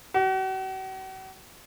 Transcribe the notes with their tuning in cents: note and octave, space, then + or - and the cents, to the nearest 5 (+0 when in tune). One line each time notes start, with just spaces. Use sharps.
F#4 +45